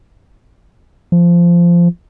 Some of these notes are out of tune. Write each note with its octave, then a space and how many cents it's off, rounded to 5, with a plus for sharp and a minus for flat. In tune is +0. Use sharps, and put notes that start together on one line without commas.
F3 -15